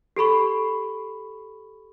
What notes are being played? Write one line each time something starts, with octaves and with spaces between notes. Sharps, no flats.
G4 A4 B5 C#6